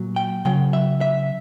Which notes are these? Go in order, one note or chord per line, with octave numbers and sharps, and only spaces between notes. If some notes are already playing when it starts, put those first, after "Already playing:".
Already playing: A#2 F#3
G5
C#3 F#3 G5
E5
E5